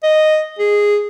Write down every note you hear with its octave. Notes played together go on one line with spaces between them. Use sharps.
D#5
G#4